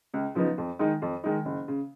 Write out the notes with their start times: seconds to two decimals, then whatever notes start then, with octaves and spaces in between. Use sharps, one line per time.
0.14 C#2
0.35 C#3 F3 B3 D#4
0.58 F2
0.79 D#3 G#3 D#4
1.02 F2
1.24 D#3 G#3 D#4
1.45 F#1
1.68 C#3